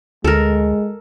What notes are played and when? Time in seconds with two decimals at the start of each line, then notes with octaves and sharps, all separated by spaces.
0.24 D2 G#3 A4 A#4